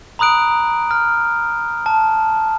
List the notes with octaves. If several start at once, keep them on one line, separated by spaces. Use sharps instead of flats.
A#5 B5 D#6 F#6 D7
F6
A5